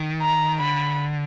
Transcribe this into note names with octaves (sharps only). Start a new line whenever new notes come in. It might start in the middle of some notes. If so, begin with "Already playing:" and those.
Already playing: D#3
A#5
D3 B5